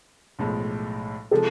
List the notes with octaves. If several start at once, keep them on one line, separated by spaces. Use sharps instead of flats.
B1 A2 F3 G#3
C3 F3 G#3 A4